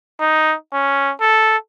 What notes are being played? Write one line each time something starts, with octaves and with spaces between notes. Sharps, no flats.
D#4
C#4
A4